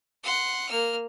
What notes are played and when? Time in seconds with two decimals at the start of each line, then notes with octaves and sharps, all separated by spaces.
0.24 F#5 C6
0.68 A#3 F6